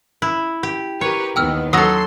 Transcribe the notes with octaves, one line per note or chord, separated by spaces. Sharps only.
E4
G4
G4 A#4 B4 C#5
D#2 D#3 B3 G5 E6 F6
F#3 A4 C6 D#6 E6 A#6